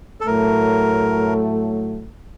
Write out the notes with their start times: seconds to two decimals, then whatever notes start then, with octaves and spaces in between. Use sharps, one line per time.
0.21 A4
0.26 A2 F#3 A3 A#4